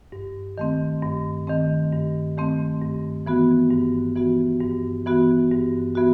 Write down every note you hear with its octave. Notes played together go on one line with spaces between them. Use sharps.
G2
D#3 A3 C4
G2
D#3 A3 C4
G2
D#3 A3 C4
G2
E3 B3 F#4
G2
E3 B3 F#4
G2
E3 B3 F#4
G2
E3 B3 F#4